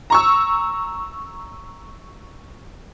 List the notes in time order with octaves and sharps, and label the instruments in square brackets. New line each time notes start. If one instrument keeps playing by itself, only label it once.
[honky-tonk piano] A#5 C#6 E6